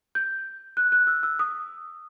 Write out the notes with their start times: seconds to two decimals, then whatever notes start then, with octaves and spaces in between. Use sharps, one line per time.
0.15 G6
0.77 F#6
0.92 F#6
1.07 E6
1.23 E6
1.39 D#6